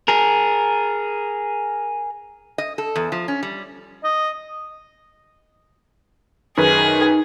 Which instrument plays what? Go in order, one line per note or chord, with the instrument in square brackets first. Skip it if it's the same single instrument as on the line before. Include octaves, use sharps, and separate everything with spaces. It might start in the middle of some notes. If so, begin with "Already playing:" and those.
[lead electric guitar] G#4 A#4
[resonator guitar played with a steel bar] D#5
A4
E2
F3
C#4
G3
[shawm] D#5
[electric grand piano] F#2 D#3 B4 [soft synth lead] D#4 [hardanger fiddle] G#4